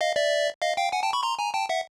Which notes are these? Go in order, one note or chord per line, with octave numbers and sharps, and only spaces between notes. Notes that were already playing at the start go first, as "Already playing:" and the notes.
D#5 F5
D5 E5
D#5 F5
F5 G5
F#5 G#5
G5 A5
B5 C#6
A#5 C6
G#5 A#5
G5 A5
E5 F#5